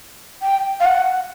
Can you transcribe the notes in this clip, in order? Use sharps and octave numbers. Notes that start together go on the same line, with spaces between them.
G5
F5
F#5